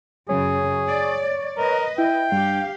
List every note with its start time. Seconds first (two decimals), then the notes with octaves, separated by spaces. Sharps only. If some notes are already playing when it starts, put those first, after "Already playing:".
0.29 F#2 C#3 G#4 C#5
0.88 D5
1.57 A#4 B4 D#5
1.98 E4 G5
2.32 G2 G4 F5